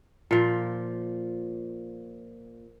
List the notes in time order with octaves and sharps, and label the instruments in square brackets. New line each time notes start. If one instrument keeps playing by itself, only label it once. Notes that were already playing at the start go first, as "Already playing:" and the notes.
[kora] A#2 F3